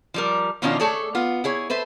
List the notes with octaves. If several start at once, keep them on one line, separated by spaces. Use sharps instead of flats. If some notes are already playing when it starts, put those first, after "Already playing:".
F3 G3 A#4
B2 D#3 F3 C#4 D4 F4
A3 G#4 A4 C#5 D5
B3 F4
E4 G#4 C#5
A4 B4 C5 E5